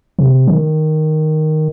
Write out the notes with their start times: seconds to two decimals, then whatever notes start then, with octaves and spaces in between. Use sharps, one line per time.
0.19 C3
0.47 D#3